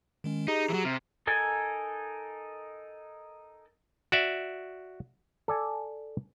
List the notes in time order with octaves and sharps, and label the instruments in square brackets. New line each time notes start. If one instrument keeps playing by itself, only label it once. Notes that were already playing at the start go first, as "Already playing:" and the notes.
[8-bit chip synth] D#3 G#3 C#4
[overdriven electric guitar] D#4 [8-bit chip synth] G4 G#4 A#5
[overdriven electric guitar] E3 F#3
[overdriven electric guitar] C3 [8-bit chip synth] A#5 F6
[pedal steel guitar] D#4 A4 A#4 G#5
[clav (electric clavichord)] F#4 D5 E5
A4 D5 G#5